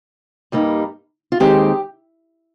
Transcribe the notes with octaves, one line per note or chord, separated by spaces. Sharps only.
G2 G3 A#3 D#4
F4
D#2 D#3 G#3 C4 G4